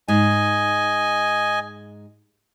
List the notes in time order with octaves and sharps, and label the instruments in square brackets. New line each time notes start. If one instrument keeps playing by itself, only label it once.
[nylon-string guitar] G#2 [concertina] D#5 G#5